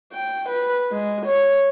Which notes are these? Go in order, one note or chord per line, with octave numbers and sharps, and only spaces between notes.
G5
B4
G#3
C#5